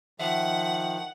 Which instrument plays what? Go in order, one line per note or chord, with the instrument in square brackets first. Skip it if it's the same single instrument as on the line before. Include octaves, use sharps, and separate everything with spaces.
[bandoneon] D#3 F3 [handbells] E5 [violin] F#5